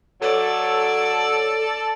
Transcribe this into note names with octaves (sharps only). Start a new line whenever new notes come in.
F#3 A4 D5